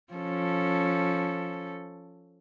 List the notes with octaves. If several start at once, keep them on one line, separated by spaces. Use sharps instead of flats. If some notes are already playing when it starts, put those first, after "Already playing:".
F3 C#4 A4